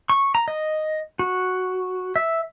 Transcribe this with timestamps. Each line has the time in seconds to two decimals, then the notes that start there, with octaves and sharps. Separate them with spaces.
0.10 C#6
0.35 A#5
0.48 D#5
1.19 F#4
2.16 E5